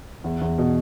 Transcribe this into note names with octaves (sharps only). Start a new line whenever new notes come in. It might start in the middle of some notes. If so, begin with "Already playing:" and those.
E2
E2
B2